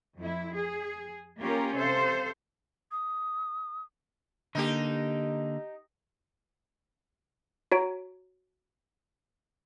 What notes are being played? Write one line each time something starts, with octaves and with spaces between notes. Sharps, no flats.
F2 E4
G#4
A#3 C#4 F4 G4 A#4
C3 A4 C5 F5
D#6
D3 A#3 D#4 G4
F#4 C#5 A#5 D7